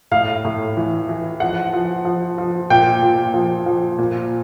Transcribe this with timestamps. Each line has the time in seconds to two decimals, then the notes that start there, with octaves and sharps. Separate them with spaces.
0.11 A2 F5
0.45 A2
0.77 E3
1.09 E3
1.40 F3 F#5
1.73 F3
2.05 F3
2.38 F3
2.70 A#2 G5
3.02 A#2
3.34 F3
3.66 F3
3.98 A#2